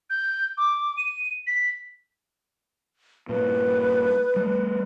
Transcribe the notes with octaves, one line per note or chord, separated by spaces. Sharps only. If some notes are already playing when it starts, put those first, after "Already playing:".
G6
D6
D#7
B6
G2 A#2 B4
G3 A3